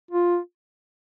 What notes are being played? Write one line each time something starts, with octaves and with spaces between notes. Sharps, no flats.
F4